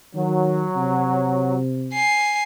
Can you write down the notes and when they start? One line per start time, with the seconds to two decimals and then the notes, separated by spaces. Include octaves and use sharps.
0.14 D#3 F#3
0.76 C3
1.94 G#5 C7